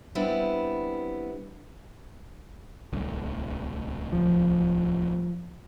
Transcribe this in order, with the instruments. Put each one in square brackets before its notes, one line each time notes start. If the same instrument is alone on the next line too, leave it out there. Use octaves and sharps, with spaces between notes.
[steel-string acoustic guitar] G3 B3 C4 D4 E4
[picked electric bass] D1 C2 D3
[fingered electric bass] F3